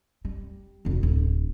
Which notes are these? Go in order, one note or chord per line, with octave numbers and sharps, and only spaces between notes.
G3
F1 D2
D1